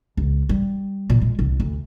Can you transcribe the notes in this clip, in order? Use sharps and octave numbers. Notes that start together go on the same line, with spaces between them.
C#2
G3
A#2
G#3
C2
D2